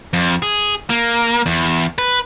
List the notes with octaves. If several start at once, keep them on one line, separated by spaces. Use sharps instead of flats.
F2
G#4
A#3
E2
B4